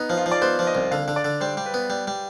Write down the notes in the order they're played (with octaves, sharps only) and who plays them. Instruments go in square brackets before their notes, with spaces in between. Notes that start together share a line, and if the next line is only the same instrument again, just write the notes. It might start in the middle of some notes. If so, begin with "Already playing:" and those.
Already playing: [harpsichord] B3 [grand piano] D#4
[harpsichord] F3
[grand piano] F4
[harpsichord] F3
[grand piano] D5
[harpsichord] B3 [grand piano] C5
[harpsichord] F3
[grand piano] D#5
[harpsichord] C2
[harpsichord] D3 [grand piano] F5
[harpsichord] D3
[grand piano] D5
[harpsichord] D3
[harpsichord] G3 [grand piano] C5
[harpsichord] G3
[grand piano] B4
[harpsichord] B3
G3
G3